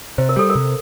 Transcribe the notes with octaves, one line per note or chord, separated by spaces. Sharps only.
C3 C5
A#4
G3 A4
A#4
C3